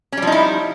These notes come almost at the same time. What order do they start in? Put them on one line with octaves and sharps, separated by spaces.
C#4 G3 F3 D#4 E4